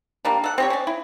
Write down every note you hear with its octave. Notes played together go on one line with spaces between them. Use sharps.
G3 A#3 D4
A4 F#5
C4 G4 C#5
C#4 D5
E4